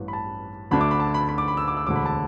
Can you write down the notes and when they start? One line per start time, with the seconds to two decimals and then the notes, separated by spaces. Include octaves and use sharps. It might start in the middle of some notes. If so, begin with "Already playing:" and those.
Already playing: A1 G2 E3
0.08 B5
0.13 A5
0.71 D2 D3 A3 D4 B5
0.81 D6
0.91 B5
1.00 A5
1.14 B5
1.29 B5
1.38 D6
1.48 B5
1.57 E6
1.68 D6
1.77 E6
1.87 E1 D2 D3 D6
1.96 B5
2.06 A5